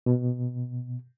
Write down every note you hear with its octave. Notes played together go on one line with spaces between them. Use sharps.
B2